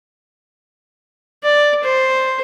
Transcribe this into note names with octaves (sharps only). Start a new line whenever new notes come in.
D5
C5